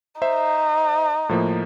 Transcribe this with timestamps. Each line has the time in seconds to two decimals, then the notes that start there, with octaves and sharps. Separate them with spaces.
0.22 D#4 C5 E5
1.29 A2 F3 A#3